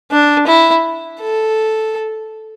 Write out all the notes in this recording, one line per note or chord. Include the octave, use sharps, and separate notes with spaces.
D4
E4
A4